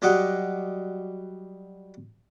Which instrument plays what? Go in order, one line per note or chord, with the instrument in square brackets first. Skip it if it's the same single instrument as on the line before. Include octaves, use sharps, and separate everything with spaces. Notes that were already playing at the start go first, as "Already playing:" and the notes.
[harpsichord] F#3 G3 D5 D#5 F#5